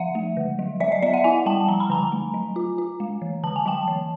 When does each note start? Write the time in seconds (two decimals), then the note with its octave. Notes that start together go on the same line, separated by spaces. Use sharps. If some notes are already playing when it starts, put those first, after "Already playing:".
Already playing: F3 E5 F#5
0.15 A3
0.37 D3
0.59 F#3
0.80 F#3 D5 E5
0.92 D#5
1.02 B3 D5 E5
1.13 E5 F#5
1.24 E4 F#5 G#5
1.46 G3 G5 A5
1.68 F3 A#5
1.80 B5
1.90 D3 G#5 A#5
2.12 A3
2.34 F#3
2.56 F4
2.78 F4
3.00 G#3
3.22 E3
3.43 D3 A5
3.56 G#5
3.66 F#3 G5 A5
3.88 E3